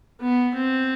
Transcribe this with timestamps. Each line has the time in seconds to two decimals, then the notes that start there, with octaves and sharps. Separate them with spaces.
0.21 B3
0.55 C4